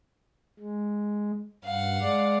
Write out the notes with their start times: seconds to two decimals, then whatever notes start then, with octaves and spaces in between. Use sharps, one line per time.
0.59 G#3
1.65 G2 F5 F#5
2.01 G#3 D5